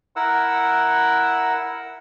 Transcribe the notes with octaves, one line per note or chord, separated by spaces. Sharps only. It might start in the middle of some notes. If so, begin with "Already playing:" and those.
E4 A#4 F#5 E6